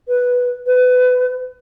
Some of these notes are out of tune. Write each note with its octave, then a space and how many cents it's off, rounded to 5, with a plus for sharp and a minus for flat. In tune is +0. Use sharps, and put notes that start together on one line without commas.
B4 -5
B4 +25